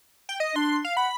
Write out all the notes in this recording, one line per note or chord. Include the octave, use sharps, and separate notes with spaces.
G5
D#5
D4 C6
F5
F#5 B5